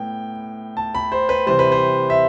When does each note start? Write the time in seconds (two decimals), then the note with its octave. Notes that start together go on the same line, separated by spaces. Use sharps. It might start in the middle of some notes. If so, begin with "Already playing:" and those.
Already playing: A2 B3 G5
0.77 A5
0.95 B5
1.12 C5
1.29 B4
1.46 C3 E3 G3 C5
1.59 B4
1.72 C5
2.10 E5